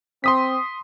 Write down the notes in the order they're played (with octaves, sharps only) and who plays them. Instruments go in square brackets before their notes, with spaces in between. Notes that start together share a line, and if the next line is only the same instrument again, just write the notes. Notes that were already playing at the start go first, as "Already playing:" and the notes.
[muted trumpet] C4 [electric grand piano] C6 D#6 B6